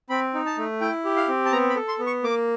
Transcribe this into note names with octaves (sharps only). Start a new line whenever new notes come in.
C4 B5
D#4
A5
A3
E4 G5
G4
F5
C4
A5
B3 A#5
B5
A4
C6
B3
C#6
A#3 D6